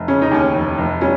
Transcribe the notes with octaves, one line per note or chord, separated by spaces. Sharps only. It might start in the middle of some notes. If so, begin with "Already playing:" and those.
Already playing: F1
C#3 C#4
D#4
D#2 C#4
F1
F1
G3 C#4